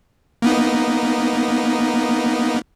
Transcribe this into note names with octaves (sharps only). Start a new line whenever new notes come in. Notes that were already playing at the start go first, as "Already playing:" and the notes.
A#3 B3 D#4